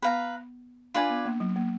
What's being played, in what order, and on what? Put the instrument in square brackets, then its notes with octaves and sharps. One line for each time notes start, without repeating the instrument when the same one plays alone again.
[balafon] B3 [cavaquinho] B4 F5 A#5
[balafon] D4 [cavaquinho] F4 B4 D5 G#5
[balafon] B3
A#3
F#3
A#3